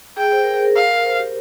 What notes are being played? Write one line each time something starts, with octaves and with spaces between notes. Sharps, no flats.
G#4 G5
C5
A#4
G#4
A#4
F5
C5
G4